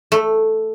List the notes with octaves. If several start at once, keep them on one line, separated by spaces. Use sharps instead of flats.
A3